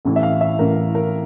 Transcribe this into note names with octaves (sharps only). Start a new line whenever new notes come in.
A1 A2 E3
E5
F5
E5
A1 A2 E3 A#4
A#4